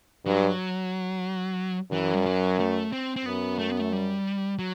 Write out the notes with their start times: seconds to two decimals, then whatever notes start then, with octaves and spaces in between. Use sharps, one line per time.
0.26 G2 F#3
1.92 F#2 E3
2.14 G3
2.26 F#3
2.59 A3
2.92 C4
3.16 C4
3.25 F#2 B3
3.59 A3
3.70 B3
3.80 A3
3.93 G3
4.59 F#3